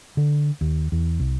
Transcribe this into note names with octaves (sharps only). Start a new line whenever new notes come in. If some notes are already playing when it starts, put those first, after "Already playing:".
D3
D#2
E2
C2